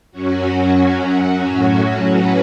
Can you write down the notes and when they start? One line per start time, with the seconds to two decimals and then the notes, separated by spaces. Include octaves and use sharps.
0.12 F#2 F#3 C#4 F#4
0.78 F#4
1.44 A2 F#3 C#4 F#4
2.12 B4